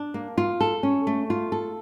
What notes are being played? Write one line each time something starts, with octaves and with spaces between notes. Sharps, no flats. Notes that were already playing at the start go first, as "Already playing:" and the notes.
Already playing: D4
A#3
F4
A4
C#4
A3
F4
A4